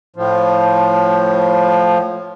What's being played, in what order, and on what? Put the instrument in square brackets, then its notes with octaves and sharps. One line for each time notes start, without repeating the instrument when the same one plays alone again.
[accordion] A2 F3